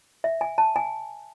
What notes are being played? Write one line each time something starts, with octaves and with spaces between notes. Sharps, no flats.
E5
G#5
A5
G#5